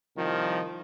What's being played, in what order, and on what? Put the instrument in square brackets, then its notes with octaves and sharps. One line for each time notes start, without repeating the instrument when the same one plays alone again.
[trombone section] C2 D#3 F3